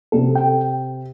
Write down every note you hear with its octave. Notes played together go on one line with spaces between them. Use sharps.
C3 A4
G5